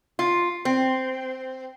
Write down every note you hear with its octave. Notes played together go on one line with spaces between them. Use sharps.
F4
C4